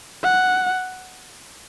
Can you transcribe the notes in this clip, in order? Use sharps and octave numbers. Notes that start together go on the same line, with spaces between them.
F#5